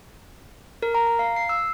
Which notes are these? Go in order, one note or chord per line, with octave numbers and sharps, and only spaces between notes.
A#4
A#5
A#5
F5
C7
E6